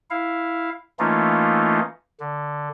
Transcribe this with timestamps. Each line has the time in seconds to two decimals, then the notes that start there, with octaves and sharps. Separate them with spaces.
0.10 E4 F5
0.99 E3 A3 A#3 C#4 D#4 F4
2.20 D3